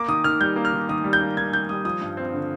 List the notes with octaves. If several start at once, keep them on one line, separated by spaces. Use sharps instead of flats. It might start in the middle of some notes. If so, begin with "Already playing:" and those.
Already playing: A#3 D6
D#3 D#6
D#3 F6
G3 G6
A#3
F6
D#3
D#3 D#6
G3
G6
A#3
D#3 G#6
D#3 G6
G3 D#6
F3 D#6
G2
C4
D3